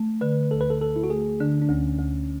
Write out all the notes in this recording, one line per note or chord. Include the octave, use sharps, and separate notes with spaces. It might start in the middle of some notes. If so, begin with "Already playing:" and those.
Already playing: A3
D3 B4
D2 A4
B4
A4
D2 A4
E4
F#4
A3 G#4
D3 D4
D4
D2 C#4
D2